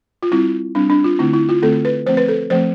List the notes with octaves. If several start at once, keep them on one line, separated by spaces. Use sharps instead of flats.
F4
G3 C4 E4
G3 C4 D4
D4
F4
D3 A3 C4 E4
E4
F4
D3 A3 C4 A4
B4
F3 A3 C4 C5
B4
A4
F3 A3 C4 C5